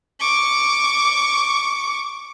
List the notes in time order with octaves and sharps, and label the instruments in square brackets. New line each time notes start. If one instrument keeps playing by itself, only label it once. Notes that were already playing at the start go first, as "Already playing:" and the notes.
[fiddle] C#6 D6